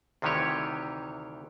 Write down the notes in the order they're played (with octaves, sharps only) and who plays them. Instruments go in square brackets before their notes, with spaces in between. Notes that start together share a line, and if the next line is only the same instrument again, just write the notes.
[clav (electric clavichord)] D2 C3 D#3 E3 G4 C#5